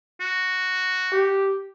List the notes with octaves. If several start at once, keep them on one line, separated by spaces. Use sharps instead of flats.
F#4
G4